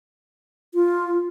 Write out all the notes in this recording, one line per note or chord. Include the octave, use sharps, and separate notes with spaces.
F4